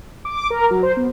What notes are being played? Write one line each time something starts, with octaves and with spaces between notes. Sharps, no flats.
D6
A#4
F#3
C5
B3